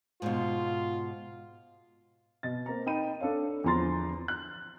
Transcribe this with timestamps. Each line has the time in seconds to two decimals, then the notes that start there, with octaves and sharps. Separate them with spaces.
0.22 G#2 B2 F4
2.43 B2 D#5 A6
2.66 A#3 C4 A#5
2.86 D#4 G5 B5 D#7
3.20 D4 A4 C#5 F5
3.64 E2 D3 F3 A#5 C6 A6
4.28 F#6